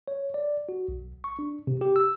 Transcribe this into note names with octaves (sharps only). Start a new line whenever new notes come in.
C#5
D5
F#4
B1
C#6
D4
C3
G4
E6